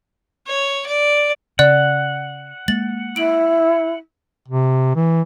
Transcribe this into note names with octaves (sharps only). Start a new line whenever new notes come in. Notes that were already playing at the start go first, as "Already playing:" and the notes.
C#5
D5
C#3 D5 F#5 F#6
G#3 A#3 A6 F#7
E4 D7 F#7
C3
E3